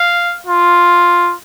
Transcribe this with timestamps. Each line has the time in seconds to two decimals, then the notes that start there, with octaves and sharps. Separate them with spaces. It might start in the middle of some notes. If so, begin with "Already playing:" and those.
Already playing: F5
0.47 F4